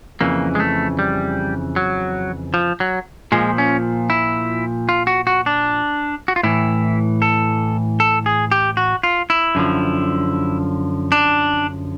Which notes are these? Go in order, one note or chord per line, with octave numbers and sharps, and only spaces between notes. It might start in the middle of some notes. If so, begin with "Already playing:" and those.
F2 C#3 E3 A#3
G#3
A3
G3
F#3
F3
F#3
A#2 F3 G#3
C#4
E4
F4
F#4
F#4
D4
F#4
F4
A2 E3 E4
A4
A4
G#4
G4
F#4
F4
E4
F#2 D3 F3
D4